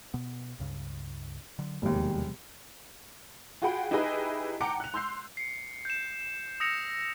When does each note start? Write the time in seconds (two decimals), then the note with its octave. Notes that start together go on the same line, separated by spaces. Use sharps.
0.14 B2 B3
0.59 C#2 G2 C#3
1.59 D3 F#3
1.82 E1 D#2 C3 F3 G3
3.62 F4 F#4 G#4 F#5 G5 B5
3.91 D#4 E4 G4 G#4 B4 D#5
4.60 F#5 G5 A5 A#5 D6 C#7
4.80 F#6 F7
4.94 C6 E6 G6 C7
5.37 C7 C#7
5.85 G6 E7
6.60 D#6 E6 A#6 C#7 F7